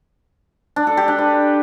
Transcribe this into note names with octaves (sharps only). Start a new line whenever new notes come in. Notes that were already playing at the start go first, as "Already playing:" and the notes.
D4
A4
G4
D4
B4